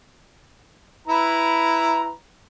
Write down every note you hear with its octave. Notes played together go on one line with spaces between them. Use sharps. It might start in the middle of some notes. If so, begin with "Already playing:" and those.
E4 B4 A#5